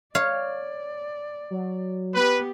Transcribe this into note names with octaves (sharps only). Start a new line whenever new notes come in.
C#5 D5 F5
F#3
B3 G4 B4